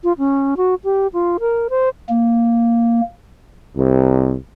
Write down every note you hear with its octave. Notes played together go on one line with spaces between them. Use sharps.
F4
C#4
F#4
G4
F4
A#4
C5
A#3
C2